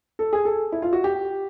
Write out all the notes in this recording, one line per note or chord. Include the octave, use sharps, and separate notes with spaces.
A4
G#4
A4
E4
F4
F#4
G4